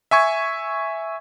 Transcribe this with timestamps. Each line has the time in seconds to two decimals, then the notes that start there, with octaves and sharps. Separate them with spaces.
0.11 E5 G#5 C#6 G#6